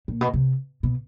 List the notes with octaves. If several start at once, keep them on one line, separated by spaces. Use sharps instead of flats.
A#2
B2
C3
B2